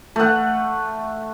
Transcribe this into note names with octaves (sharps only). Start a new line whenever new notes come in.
A3 F#5